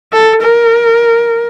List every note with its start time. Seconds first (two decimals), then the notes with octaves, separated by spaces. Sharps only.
0.13 A4
0.42 A#4